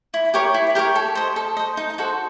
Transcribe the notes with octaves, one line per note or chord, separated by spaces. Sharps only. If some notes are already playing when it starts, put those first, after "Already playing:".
E4
G4 A#4 C#5
E4
G4 A#4 C#5
A4
C5 D#5
A4
C5 D#5
D#4
F#4 A4 C5